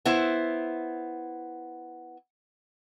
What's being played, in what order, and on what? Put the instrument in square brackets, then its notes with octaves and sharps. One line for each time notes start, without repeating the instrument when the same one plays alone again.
[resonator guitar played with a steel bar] B3 E4 C5